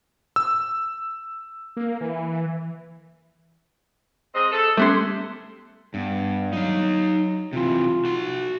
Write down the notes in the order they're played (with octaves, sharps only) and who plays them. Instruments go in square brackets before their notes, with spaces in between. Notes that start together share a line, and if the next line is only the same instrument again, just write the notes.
[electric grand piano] E6
[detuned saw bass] A#3
E3
[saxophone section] G#3 C4 D#5
A4
[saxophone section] C3 [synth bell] G3 B3 C#4 [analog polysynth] A3 C6
[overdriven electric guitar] G2 [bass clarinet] B3
[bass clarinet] F#3 [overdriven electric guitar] D#4 F5
[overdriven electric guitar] C3 E3 [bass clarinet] F4
[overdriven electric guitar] F#4 C6